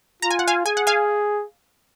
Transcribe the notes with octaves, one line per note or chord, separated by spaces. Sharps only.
F4 A#5
G#5
F#5
F5 G#5
G#4 G#5
F#5
F5 G#5